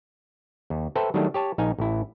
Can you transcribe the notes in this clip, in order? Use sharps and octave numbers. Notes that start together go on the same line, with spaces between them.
D#2
A4 B4 C5 E5 G5
D#3 F#3 G3 A3 D4
G4 C#5 A5
A#1 D#4 F5 G#5
A1 E4